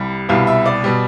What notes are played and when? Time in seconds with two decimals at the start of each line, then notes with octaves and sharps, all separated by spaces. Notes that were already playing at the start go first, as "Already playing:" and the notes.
Already playing: C2 G3
0.29 C2 B2 G3 F5
0.47 E5
0.66 D5
0.84 B2 G3